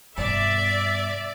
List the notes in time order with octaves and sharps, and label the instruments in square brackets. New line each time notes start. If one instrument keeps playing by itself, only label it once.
[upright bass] G2 B2 [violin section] D5 [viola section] E5